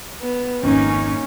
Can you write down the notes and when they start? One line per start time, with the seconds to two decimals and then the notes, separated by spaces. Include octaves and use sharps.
0.22 B3
0.63 G#1 F2 A#3 C#4 D#4